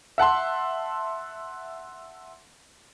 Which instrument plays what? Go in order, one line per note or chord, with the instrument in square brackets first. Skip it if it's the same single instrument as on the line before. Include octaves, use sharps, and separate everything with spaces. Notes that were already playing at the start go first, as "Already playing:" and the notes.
[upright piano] E5 F#5 A5 C6